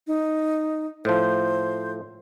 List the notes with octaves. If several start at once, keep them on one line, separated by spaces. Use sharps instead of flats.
D#4
A2 F3 C5